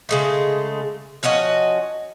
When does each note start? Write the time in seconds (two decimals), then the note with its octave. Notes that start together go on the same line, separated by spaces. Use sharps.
0.09 C#3 G#3 A3
1.23 F3 C#4 F#4 D#5